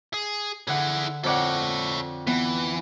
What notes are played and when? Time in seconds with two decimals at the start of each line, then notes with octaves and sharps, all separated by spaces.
0.14 G#4
0.67 D3 E4 G#4 F#5
1.24 F2 A4 C#5 D5 F#5
2.27 E3 B3